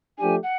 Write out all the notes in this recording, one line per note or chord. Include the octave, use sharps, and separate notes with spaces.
F3 A3 D4 G4 G#5
F#5